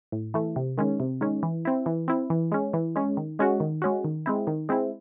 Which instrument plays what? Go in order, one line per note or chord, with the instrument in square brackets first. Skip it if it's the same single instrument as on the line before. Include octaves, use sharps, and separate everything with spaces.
[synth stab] A2
E3 A3
C3
D#3 G#3 C#4
C3
D#3 G#3 C#4
E3
C4 E4
E3
C4 E4
E3
G#3 C#4
E3
G#3 C#4
D#3
G#3 C#4 F#4
D#3
G#3 C#4 F#4
D#3
G#3 C4 E4
D#3
G#3 C4 E4